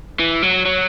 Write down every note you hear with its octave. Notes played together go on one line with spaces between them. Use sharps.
E3
F#3
F#3